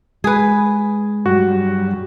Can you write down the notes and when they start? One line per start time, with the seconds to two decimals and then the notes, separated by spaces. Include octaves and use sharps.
0.24 G#3 G#4 B4
1.26 G2 F#3 G3 F#4